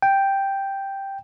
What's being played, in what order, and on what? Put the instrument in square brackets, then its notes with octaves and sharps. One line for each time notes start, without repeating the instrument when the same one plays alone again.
[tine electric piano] G5